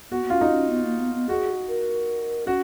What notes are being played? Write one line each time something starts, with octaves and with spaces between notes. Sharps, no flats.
B3 F#4
B3
C#4 F4
D#4
C#4
B3
A#3
B3
B3
F#4 G#4
A#4
C#4 F#4